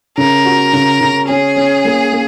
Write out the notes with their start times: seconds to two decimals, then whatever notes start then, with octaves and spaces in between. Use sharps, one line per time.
0.18 C#3 A#4
0.45 F#4
0.73 C#3
1.01 C#3
1.28 C#4 G#4
1.56 C#4
1.85 A#3
2.12 A#3